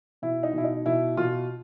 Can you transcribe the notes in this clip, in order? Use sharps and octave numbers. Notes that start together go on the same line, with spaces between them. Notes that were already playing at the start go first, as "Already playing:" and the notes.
B2 E4
D#4
B2 E4
D#4
B2 E4
B2 F4